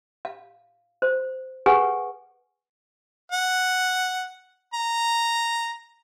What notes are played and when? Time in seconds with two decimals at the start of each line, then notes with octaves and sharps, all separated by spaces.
0.25 F5
1.02 C5
1.66 G#4 A4 B4 F#5 G#5 C#6
3.32 F#5
4.74 A#5